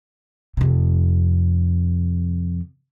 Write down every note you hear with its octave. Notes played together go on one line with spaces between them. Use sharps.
F2 C3